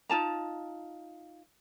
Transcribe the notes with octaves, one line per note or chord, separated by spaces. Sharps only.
D#4 F4 A5 A#5